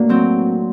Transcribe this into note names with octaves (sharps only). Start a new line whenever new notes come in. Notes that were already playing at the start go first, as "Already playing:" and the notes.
Already playing: A2 A#3 D4 F#4
F#3 C4